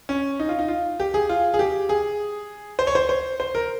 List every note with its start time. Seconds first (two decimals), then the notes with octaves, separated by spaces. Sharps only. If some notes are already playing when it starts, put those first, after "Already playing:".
0.09 C#4
0.40 D#4
0.49 F4
0.59 D#4
0.68 F4
1.00 G4
1.14 G#4
1.29 F4
1.54 G#4
1.59 G4
1.89 G#4
2.79 C5
2.87 C#5
2.95 C5
3.09 C5
3.40 C5
3.55 A#4